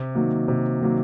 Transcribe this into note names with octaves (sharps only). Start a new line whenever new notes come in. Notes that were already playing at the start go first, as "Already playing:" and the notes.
Already playing: C3
D#3 F#3 A#3
C3
D#3 F#3 A#3